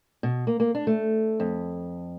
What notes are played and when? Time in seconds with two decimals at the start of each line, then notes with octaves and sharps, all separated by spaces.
0.23 B2
0.47 A#3
0.60 A#3
0.75 D4
0.87 A3
1.40 F2